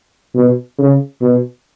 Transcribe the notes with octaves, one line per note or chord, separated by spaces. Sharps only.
B2
C#3
B2